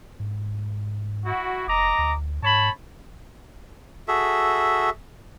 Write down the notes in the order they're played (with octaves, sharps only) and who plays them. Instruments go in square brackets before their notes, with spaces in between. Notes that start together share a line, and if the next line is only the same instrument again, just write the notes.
[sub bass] G#2
[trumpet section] E4 F#4
[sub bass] F1 [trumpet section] D#5 A#5 D6
[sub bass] D2
[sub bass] G#2 [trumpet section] C#5 A5 B5
[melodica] F#4 G#4 A4 E5